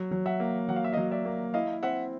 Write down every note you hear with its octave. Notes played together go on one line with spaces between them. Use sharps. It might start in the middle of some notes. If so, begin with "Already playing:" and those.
Already playing: F#3
F#3
E5 F#5
A#3
F#3 F#5
F5
E5
F#3 D#5 F5
D5 E5
A#3
E4 D#5 F5
C4 E5 F#5